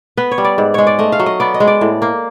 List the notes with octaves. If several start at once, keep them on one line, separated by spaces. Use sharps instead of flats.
B3 B4
C#5
G3
D5
G#2
G#3 C#5
D5
A3 D#5
F5
F#3
D#5
B3 D5
D#5
G#3
D5
A2
A#3